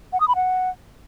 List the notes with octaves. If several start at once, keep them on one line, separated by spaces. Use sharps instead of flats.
F#5
D#6
B5
F#5